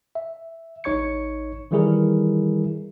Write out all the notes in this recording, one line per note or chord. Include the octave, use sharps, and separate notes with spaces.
E5
A1 D#4 C#5 C#6 G#6 C#7
D#3 E3 G3 E4 G#4 A#4